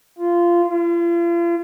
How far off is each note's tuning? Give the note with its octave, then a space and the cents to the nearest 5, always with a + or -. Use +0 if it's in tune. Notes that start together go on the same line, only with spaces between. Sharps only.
F4 -15
F4 -40